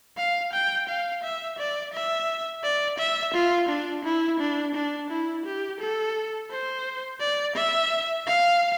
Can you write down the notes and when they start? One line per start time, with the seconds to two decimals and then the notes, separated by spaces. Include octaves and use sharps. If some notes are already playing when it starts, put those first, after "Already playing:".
0.17 F5
0.53 G5
0.88 F5
1.23 E5
1.58 D5
1.94 E5
2.63 D5
2.99 E5
3.34 F4
3.69 D4
4.04 E4
4.40 D4
4.75 D4
5.10 E4
5.45 G4
5.80 A4
6.50 C5
7.20 D5
7.56 E5
8.27 F5